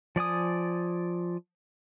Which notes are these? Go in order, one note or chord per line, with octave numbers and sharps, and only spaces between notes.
F3 D5 G#5 D#6